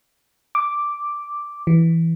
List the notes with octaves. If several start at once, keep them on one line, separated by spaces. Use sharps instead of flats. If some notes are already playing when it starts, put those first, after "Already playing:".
D6
E3